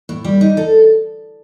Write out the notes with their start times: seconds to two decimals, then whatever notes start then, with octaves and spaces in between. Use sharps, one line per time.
0.09 A2
0.24 G3
0.41 D#4
0.57 A4